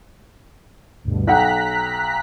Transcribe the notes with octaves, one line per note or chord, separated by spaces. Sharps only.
D2 G2 B2
B1 F#5 G5 A#5 F#6 B6